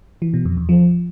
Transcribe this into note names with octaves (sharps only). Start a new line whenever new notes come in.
E3
B2
F2
E2
F3